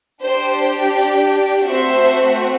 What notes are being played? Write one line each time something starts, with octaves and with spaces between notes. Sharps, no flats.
D4 G4 C5
A3 C4 F#4 C5 E5